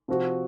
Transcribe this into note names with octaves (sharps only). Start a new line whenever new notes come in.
C3 F3 C4 F#4